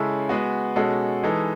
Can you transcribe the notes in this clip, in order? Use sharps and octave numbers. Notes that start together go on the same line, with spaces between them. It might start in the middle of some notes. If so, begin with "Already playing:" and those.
Already playing: C#3 G#3 C#4 E4 A4
G#3 B3 F#4
B2 G#3 C#4 F#4 A4
E3 G#3 D#4 A4